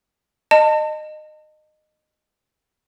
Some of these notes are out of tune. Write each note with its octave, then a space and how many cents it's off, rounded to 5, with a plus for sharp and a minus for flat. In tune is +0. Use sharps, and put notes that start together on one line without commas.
D#5 -20 A5 +30